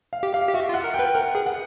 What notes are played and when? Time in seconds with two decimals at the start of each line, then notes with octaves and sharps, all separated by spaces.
0.13 F5
0.23 G4
0.34 F5
0.48 G4
0.54 F#4 E5
0.69 F4
0.74 F#5
0.84 A#4
0.94 G5
0.99 B4
1.14 A#4 F#5
1.35 G#4
1.46 F#5